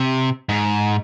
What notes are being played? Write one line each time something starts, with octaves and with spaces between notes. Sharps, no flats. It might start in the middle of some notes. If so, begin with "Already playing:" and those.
Already playing: C3
G#2